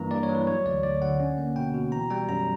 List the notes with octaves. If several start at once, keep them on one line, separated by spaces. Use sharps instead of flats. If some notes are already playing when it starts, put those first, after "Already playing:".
Already playing: G2 E3 A#3 A#5
G2 D5
C#5
E3
B4
F#3 C#5
D2 D5
D2 D5
D3 F#5
C#4
A#3
B2 G5
B2
E3 A#5
G3 G5
F#2 A#5